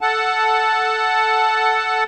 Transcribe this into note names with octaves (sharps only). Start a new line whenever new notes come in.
A4 F#5 A5